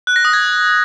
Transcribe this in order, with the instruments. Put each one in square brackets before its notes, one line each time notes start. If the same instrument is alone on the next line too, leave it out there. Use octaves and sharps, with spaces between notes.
[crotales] F#6
A#6
D#6
G#6